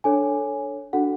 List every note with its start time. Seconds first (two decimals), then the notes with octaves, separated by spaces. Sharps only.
0.04 D4 A4 C#5 G#5
0.93 D4 F#4 A4 F#5